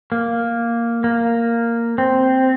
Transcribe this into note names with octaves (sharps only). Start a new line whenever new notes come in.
A#3
A#3
C4